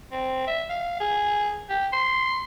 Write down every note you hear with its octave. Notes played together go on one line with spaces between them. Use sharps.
C4
E5
F5
G#4
G4
C6